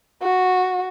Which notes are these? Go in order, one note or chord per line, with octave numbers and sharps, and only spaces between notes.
F#4